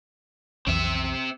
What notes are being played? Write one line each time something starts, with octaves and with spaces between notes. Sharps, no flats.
B1 F2 E3 C4 E5